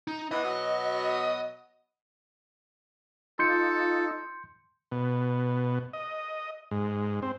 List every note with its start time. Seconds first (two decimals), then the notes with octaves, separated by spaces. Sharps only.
0.08 D#4
0.31 E3 B3 D#5
0.43 B2 F#3 B3
3.39 D#4 F4 A4 C6 G6 C#7
4.92 B2
5.93 D#5
6.71 G#2
7.22 C4